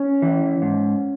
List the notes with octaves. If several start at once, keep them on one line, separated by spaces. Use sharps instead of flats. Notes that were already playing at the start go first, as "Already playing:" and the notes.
Already playing: C#4
E3
G#2